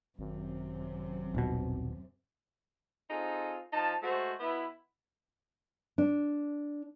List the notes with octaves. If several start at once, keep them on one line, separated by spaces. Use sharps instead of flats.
G#1 F#2 C3
D#1 B2
C4 D#4 F4 G#4 A4
F3 D#4 A5
G#3 A3 F#4 C5
B2 B3 E4
D4